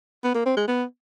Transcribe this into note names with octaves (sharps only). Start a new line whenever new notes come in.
B3
A#3
C4
G#3
B3